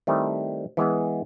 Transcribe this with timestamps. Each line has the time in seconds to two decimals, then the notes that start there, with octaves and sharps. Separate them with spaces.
0.07 D#3 G3 A3 C4 E4
0.77 E3 G#3 B3 G#4